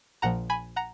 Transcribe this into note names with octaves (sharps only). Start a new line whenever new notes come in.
A#1 A#2 F3 F#5 A#5
G#5 B5
F#5 A#5